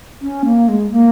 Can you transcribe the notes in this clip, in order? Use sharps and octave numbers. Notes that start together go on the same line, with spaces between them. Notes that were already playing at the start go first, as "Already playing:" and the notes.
C#4
A#3
G#3
A#3